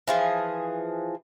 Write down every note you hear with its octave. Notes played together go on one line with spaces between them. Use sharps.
E3 F3 G#4